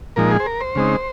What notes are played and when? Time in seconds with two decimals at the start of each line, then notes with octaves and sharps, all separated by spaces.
0.16 A#2 F3 G#3 D#4 A#4
0.31 G#4
0.40 C5
0.46 A#4
0.61 C5
0.75 C#3 G#3 C4 D#4